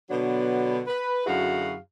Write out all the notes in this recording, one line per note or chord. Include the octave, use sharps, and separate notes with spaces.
B2 D3 F#3 B3 D4
B4
F#2 D3 E4 F#4 G#4 F5